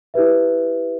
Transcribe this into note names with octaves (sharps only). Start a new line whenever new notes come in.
E4 G4 B4 E5